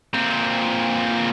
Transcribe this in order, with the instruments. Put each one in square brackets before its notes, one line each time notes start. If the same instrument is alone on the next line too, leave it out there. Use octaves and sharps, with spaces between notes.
[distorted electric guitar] A#2 C4